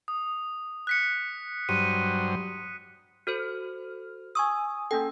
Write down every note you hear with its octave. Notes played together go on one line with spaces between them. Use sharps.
D#6
F#6 B6 C#7
G2 F#3 C5 D#7
F#4 A4 C5 F6
G#5 C#6 D#6 E6
A#3 C#4 A4 G5 G#5